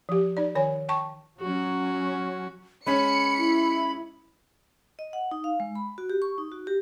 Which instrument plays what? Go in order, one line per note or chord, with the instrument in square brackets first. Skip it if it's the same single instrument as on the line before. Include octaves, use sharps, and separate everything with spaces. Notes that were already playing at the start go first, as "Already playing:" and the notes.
[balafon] F3 G4
D#4 D5
D#3 C#5 G#5
G5 A5 C#6
[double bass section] F#3 C#4 [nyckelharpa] F#4
[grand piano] G#3 C#4 C#5 [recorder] B5 [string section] C#7
[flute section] E4
[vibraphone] D#5
F#5
D#4
F5
G#3
B5
F#4
G4
C#6
D#4
F#4
G4